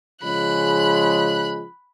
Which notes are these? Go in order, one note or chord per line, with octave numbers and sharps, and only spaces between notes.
C#3 F3 G#3 B5 F#6